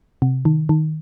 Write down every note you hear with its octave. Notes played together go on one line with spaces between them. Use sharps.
C3
D#3
D#3